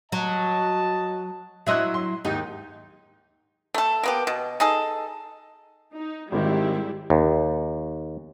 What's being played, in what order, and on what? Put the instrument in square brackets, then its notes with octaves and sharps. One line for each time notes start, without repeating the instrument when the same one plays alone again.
[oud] F#3 [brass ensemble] D#5 A5
[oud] F#3 E4 D#5 [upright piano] E5 C6 F#6
[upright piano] C6
[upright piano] D#2 G#2 [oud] D#4 G4
[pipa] A3 A4
A#3 B3 G4
B2
D#4 G#4 A4
[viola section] D#4
[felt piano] G#1 D#3 [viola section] G3 G#3 E4
[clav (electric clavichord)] D#2